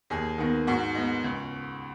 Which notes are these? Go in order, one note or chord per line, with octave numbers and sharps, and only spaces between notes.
D#2 G#4
D#3 B3
G#2 F#4
G#3 B3
C#2